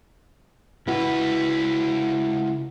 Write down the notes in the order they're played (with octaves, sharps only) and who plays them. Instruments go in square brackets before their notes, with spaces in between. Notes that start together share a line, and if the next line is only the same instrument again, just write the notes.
[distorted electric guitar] C#2 B4 [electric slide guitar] E4 F#4